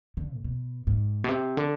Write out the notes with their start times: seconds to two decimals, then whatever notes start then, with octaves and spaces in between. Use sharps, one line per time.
0.17 D3
0.37 G#2
0.44 B2
0.87 G#2
1.24 B2
1.29 C3
1.57 D3